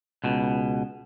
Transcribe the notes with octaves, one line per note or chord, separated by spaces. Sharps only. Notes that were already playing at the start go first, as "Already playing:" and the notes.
C#2 B2